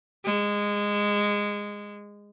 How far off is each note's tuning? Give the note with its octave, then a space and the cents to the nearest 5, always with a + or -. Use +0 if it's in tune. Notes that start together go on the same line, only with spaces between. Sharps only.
G#3 -15